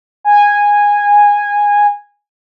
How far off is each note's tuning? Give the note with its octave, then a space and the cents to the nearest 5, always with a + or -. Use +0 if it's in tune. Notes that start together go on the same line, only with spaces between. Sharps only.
G#5 -15